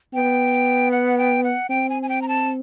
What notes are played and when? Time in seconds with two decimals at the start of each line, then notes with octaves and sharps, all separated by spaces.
0.14 B3 G5
0.91 F#5
1.18 G5
1.44 F#5
1.69 C4 G5
1.89 G#5
2.03 G#5
2.09 G5
2.22 A#5
2.28 A5